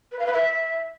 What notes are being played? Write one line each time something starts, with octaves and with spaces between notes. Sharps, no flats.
B4
F5
B4
E5